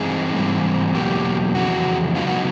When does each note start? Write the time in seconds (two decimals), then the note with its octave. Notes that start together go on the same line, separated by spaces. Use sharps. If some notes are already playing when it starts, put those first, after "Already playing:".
Already playing: G2 E3 G#3 C4 D#4 G#4
0.34 G#2 E3 G3 C4
0.94 E2 B2 F#3 A#3 G4
1.55 F2 C#3 E3 G#3 F#4
2.15 C#3 F#3 B3 D#4 F4
2.27 F#4